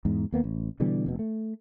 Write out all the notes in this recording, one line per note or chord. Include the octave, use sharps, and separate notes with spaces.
E2 G#2
D#2 A#3 B3
A1
B2 D3 E3 G3
F1 B2
A3